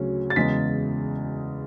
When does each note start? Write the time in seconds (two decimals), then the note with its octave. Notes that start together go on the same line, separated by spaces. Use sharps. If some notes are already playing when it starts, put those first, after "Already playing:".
Already playing: D2 C#3 F#3 C#4
0.30 A6
0.36 E2 C#3 G#3 B6